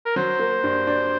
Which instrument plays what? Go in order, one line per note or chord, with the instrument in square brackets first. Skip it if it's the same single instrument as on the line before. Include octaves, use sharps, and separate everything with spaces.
[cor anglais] A#4
[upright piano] F#3 [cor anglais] C5
[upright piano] A#3
G2
D4